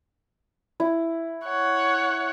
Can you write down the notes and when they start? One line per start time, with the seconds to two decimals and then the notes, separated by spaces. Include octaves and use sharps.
0.80 E4
1.45 C#5 F#5